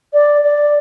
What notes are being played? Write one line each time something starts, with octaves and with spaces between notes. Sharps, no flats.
D5
D5